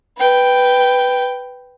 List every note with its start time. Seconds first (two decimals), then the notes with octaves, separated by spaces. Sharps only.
0.17 B4 G5